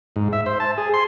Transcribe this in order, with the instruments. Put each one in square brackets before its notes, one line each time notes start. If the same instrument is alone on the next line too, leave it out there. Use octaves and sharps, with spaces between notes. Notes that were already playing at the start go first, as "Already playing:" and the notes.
[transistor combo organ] G#2
E5
C5
A5
G#4
C6